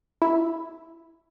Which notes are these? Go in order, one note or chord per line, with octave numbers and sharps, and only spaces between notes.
E4